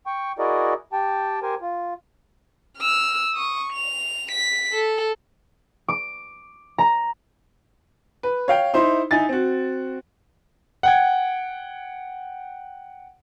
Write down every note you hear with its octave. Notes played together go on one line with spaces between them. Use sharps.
G5 C#6
E4 F#4 G#4 A#4 D5 D#5
G4 G5 A5
G4 A#4 C5 G#5
F4
E6 F6
C#6 D#6
F7
B6
A4
D6
A#5
B4
C#5 F5 G5
D#4 E4 C5 C6
D#4 E4 G#5 A6
C4 F#4
F#5 G5 G#6